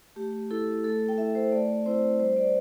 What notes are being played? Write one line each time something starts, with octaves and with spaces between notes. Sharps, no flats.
A3 G4
E4 A4
A3 A4
G5
E4 E5
C5
A3 D5
C4 E4 C5
G3 C5
D5